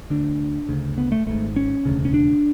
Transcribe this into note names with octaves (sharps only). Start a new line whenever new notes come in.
D2 D3 D4
D2 C#3
B3
A3
G#1 G#2 A3
C#4
E1 D2 C#3
C#4
D4